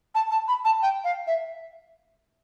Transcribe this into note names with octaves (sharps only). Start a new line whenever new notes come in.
A5
A5
B5
A5
G5
F5
E5